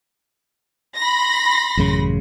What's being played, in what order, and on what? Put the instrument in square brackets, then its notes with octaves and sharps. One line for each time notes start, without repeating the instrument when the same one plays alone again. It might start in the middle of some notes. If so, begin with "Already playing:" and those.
[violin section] B5 C6 A#6
[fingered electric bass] A1 F#2 C#3